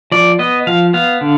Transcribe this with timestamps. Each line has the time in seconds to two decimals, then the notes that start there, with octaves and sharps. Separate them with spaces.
0.12 F3 D5
0.39 B3 D#5
0.67 F3 F5
0.94 B3 F5
1.21 D3